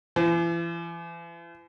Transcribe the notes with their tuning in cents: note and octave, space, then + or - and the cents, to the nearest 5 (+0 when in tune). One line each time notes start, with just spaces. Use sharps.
E3 +40